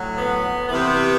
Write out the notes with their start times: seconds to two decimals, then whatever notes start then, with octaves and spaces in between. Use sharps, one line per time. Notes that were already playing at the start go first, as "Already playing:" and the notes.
Already playing: A2 F#3
0.18 B3
0.69 C3 E3 B3